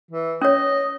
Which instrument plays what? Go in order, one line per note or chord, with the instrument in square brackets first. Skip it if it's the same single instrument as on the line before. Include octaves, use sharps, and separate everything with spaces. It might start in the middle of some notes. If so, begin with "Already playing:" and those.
[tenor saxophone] E3
[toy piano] C#4 C#5 [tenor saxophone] D#5